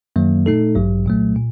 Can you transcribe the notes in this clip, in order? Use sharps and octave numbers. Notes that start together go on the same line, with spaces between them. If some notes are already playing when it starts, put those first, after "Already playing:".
F#2 D#3 F#3 A#3
A#2 A3 D#4 A4
A1 G2 F#3
C2 A#2 F#3 A3
A#2